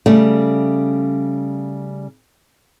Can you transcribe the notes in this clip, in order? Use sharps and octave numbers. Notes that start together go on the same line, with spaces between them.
C#3 G3 A3